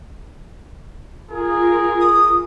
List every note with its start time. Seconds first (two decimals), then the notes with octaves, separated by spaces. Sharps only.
1.31 F4 G#4 A#4
2.01 D#6